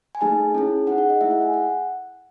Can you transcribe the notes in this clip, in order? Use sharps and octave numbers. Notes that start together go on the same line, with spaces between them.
G#5
A3 D#4 G#4 A5
C#4 E4 G#4
D#4 G#4 F#5
F#5
D#5
A3 E4 G#4 E5
F#5
G#5
F#5